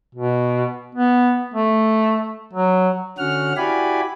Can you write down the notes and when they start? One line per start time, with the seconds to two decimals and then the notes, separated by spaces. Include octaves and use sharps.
0.15 B2
0.95 B3
1.54 A3
2.53 F#3
3.18 D3 C#4 F#4 F#5 F6
3.57 E4 F#4 G4 D5 G#5 B5